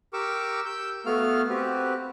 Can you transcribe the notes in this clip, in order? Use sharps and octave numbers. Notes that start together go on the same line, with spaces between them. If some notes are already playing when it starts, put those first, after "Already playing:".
G4 A#4 C#6 D6 E6
E6 G6
A3 B3 F#4 F5 F6
C4 F#4 G4 B4